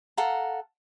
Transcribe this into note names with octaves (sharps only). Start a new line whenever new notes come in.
A4 F5 F#5 A#5